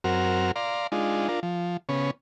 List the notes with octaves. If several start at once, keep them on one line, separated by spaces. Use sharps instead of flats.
F#2 C4 F#4 A#4 F6
D5 F5 A#5 C6
G#3 D4 D#4 F4
D4 F4 A#4
F3
C#3 B3 C#4